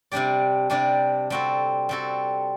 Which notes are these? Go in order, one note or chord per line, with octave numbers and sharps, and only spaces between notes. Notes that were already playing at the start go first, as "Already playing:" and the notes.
C3 G3 D4 G4 D5
C3 G3 D4 G4 D5
G3 C4 F#4 A4
G3 C4 F#4 A4